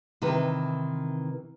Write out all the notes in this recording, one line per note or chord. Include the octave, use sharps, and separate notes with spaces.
C3 D#3 E3 B4